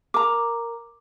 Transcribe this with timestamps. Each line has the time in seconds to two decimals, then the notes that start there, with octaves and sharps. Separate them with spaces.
0.14 A#4 A#5 D6